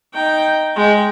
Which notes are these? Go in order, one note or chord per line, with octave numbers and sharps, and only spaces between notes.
D#4 G5
G#3 G5